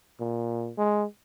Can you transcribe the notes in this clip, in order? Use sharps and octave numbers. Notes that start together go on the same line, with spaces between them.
A#2
G#3